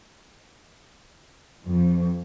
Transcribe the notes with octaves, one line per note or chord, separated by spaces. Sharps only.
F2